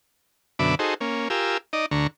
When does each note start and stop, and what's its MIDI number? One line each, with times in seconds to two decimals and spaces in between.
0.59 0.75 42
0.59 0.75 47
0.59 0.75 50
0.59 0.75 76
0.59 0.75 83
0.59 0.75 86
0.79 0.94 63
0.79 0.94 66
0.79 0.94 68
0.79 0.94 69
0.79 0.94 72
1.01 1.28 58
1.01 1.28 61
1.30 1.57 65
1.30 1.57 67
1.30 1.57 70
1.30 1.57 80
1.30 1.57 88
1.73 1.86 63
1.73 1.86 74
1.73 1.86 75
1.91 2.07 38
1.91 2.07 50
1.91 2.07 82
1.91 2.07 85